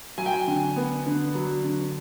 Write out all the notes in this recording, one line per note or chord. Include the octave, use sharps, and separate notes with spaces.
F#3 G#5
G5
G#5
D3
B3
D3
F#3
D3